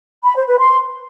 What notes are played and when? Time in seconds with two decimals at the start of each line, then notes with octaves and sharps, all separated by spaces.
0.24 B5
0.36 C5
0.47 B4
0.59 C6